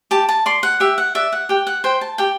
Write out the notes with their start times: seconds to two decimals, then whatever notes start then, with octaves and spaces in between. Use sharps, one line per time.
0.11 G4 A5
0.29 A5
0.46 D5 C6
0.63 F#5
0.80 G4 E5
0.98 F#5
1.15 D5 E5
1.32 F#5
1.49 G4 G5
1.67 F#5
1.84 C5 G5
2.01 A5
2.18 G4 G5